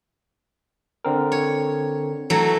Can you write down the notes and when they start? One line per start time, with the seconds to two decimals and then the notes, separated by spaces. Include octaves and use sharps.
1.05 D3 C4 A#4
1.32 C#5
2.30 E3 F#3 A3